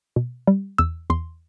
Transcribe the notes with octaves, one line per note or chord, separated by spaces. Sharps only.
B2
G3
E2 E6
E2 C6